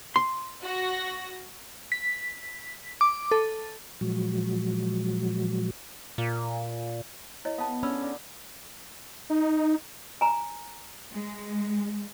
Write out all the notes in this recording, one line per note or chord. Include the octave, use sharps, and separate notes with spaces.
C6
F#4 A#6
B6
D6
A4
A#2 F3 F#3 G#3 F#4
A#2
E4 C#5 D#5
B3 F5 A5
D3 C#4 B5 E6
D3
D#4
G#5 A#5
G#3